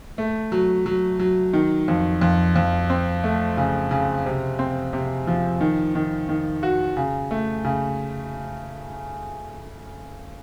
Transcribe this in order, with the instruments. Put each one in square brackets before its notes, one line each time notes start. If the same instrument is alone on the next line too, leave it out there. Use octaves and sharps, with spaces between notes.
[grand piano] A3
F#3
F#3
F#3
D#3
F2
F2
F2
C4
A3
C#3
C#3
C3
C4
C3
F3
D#3
D#3
D#3
F#4
C#3
A3
C#3